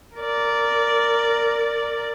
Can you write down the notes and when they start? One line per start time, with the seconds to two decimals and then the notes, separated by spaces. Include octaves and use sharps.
0.17 A#4 D5